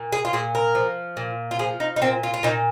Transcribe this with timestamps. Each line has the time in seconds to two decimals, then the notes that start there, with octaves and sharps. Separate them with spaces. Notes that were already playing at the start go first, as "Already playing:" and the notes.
Already playing: A#2
0.12 G#4
0.25 F4
0.33 A#2 G#4
0.55 A#4
0.75 F3
1.17 A#2
1.51 F4
1.59 F3 G#4
1.80 D#4
1.96 D#4
2.02 A#2 C4
2.23 F4
2.34 F4
2.43 A#2 D#4